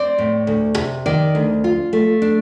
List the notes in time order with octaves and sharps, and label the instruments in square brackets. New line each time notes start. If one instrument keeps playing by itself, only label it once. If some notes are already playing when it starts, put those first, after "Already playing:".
Already playing: [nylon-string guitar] C4 D5
A2
D2
C3
D#3 D5
D2
F4
A3
D4